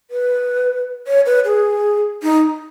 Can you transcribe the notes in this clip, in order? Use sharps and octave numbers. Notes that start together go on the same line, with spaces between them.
B4
C#5
B4
G#4
D#4